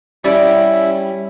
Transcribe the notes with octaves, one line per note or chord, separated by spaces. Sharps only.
G3 C#4 E4 D5